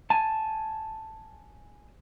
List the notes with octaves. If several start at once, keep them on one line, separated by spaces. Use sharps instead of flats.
G#5 A5